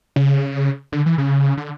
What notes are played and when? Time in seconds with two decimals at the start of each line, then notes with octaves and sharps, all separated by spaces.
0.16 C#3
0.92 D3
1.06 E3
1.18 C#3
1.57 D3